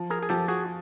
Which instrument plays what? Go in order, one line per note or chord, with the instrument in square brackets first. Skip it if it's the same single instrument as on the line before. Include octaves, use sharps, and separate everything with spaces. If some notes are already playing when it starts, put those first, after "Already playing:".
Already playing: [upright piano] F3
[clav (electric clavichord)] G#4 A#4
G#4
[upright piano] F3 [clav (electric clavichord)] G4 A4
[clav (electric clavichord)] F#4 G#4